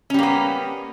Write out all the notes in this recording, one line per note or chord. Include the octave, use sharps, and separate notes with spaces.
G3 A#3 B3 C#4